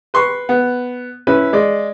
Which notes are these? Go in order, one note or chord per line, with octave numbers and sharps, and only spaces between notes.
B4 C6 C#6
B3
C#4 E4 B4
G#3 D5